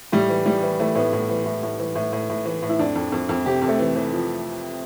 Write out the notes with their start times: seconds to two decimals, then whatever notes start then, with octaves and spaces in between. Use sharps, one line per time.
0.12 A2 G3
0.29 E3
0.46 E3 G3
0.63 E3
0.80 E3 A3
0.95 A2 B3
1.13 A2
1.29 E3
1.46 A2
1.63 A2
1.80 E3
1.95 A2
2.13 A2
2.30 A2
2.45 E3
2.63 A2
2.69 E4
2.79 F2 D4
2.96 F2
3.12 F2
3.29 F2
3.46 C3 G4
3.62 F2
3.68 A3
3.79 E3
3.96 E3
4.13 F3